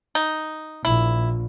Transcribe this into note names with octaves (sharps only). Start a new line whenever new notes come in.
D#4
A#1 E4